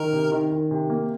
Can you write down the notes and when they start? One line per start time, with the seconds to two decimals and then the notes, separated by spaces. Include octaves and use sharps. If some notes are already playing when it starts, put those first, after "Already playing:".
Already playing: D#3 A#4
0.13 C3
0.32 D#3
0.52 D#3
0.71 C3
0.90 A#3